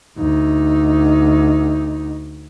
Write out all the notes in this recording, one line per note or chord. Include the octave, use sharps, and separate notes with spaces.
D2 D#4